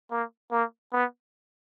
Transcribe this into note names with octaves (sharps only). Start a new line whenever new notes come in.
A#3
A#3
B3